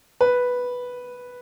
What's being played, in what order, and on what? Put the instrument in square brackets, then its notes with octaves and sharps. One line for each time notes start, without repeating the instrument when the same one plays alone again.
[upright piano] B4